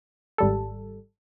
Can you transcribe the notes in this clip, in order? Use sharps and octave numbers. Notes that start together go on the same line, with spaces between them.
G#1 G3 A4